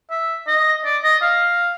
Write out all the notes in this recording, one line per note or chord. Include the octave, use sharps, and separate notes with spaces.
E5
D#5
D5
D#5
F5